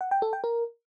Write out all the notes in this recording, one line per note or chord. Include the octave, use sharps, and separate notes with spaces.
F#5
G5
A4
G5
A#4